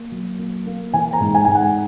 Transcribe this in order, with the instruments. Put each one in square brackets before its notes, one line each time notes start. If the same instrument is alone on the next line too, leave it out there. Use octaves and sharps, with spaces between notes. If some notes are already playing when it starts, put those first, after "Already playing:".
Already playing: [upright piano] A#3
F#3
A#3
A#3
E3 G#5
A#5
G#2
G#5
G#2 G#5
F#5